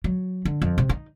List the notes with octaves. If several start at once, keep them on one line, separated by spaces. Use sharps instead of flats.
F#3
D3
F2
C3
D#4